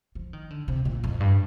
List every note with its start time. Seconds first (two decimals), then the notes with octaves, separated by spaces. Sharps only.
0.15 F3
0.33 D#3
0.50 D3
0.68 C3
0.85 A#2
1.04 F2
1.20 G2